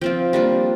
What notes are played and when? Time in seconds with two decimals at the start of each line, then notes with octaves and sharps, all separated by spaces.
0.01 F3 C4 F4 G5
0.33 G3 A#3 D4 F4